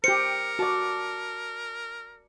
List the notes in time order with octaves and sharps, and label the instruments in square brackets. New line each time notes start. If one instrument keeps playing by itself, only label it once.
[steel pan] G4 C5 [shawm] A#4 [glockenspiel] C#7
[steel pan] F#4 [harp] D5 A5